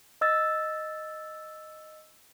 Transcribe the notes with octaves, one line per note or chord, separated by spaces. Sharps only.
D#5 E6 A6